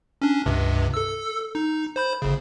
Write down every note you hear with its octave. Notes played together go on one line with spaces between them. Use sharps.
C#4 D4
C#2 G2 C3
A4 E6
D#4
C5 B5 G6
G1 C#3